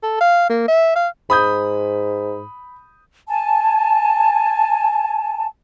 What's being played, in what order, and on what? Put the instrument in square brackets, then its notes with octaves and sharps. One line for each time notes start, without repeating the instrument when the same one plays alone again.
[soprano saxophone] A4
F5
A#3
E5
F5
[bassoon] G#2 [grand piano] B5 D#6 G6
[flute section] G#5 A5